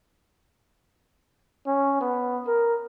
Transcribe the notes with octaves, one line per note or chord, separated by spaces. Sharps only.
C#4
B3
A#4